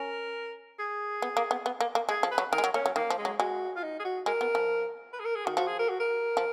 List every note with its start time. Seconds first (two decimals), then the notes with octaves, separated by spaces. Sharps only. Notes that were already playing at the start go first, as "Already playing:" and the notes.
Already playing: C#4 A#4
0.79 G#4
1.22 B3
1.37 A#3
1.51 B3
1.66 B3
1.81 A#3
1.95 A#3
2.09 G#3 G#4
2.23 F3
2.31 B4
2.38 F#3
2.52 D#3 A#4
2.58 G#3
2.64 F#3
2.74 A#3 C#4
2.86 F#3
2.96 D#3 A#3
3.10 F3
3.18 G#3
3.25 F#3
3.39 G#3 F#4
3.76 F4
3.83 D#4
3.99 G#4
4.05 F#4
4.26 G#3 A#4
4.41 B3
4.55 F3
5.13 B4
5.20 G#4
5.25 A#4
5.35 G#4
5.46 D#3 F#4
5.57 F3 F#4
5.67 G#4
5.79 A#4
5.89 F#4
6.00 A#4
6.37 F3